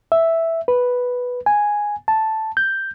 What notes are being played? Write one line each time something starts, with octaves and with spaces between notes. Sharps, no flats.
E5
B4
G#5
A5
G6